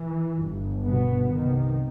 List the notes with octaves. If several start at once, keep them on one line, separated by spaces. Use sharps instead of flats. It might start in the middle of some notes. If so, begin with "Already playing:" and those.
Already playing: E3
G1 G2
B2 B3
C2 C3 D#3